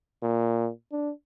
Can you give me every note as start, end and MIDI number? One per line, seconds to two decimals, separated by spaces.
0.23 0.70 46
0.92 1.11 62